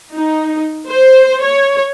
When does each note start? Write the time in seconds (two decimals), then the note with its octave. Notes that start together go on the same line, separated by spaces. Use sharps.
0.15 D#4
0.87 C5
1.42 C#5